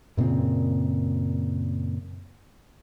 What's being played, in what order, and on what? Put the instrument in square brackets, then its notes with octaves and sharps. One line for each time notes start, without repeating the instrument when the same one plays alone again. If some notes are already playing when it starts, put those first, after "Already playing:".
[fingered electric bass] F#2 A#2 C#3 C4